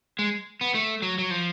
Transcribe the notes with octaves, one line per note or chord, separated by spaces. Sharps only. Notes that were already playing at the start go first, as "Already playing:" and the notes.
G#3
B3
A3
F#3
F#3
F3